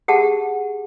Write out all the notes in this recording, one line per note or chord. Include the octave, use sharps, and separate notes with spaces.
G4 G#4 F#5 A5